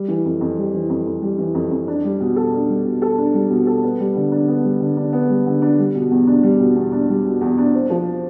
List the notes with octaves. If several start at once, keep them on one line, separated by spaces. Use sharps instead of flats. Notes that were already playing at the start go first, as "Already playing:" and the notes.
Already playing: G3
E3
F2
F2
G3
E3
F2
F2
G3
E3
F2
F2
D4
G3
B2
A4
D4
G3
B2
A4
D4
G3
B2
A4
B3
G3
D3
D4
B3
G3
D3
D4
B3
G3
D3
D4
G3
B2
E2
D4
G3
B2
E2
D4
G3
B2
E2
D4
C4
F3